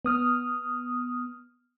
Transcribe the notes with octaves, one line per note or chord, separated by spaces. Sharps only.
B3 D#6 F6